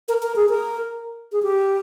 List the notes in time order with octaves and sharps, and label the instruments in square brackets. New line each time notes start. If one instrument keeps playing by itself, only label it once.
[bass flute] A#4
A#4
G#4
A#4
G#4
G4